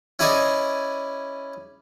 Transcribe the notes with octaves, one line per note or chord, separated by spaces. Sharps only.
C#4 E4 G#4 D5 D#5 G#5